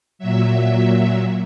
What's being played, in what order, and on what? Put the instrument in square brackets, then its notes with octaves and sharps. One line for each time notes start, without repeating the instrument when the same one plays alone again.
[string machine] A#2 F#3 E5